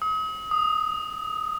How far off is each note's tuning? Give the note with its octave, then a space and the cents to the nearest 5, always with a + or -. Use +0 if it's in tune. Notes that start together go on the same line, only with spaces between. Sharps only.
D#6 +40
D#6 -10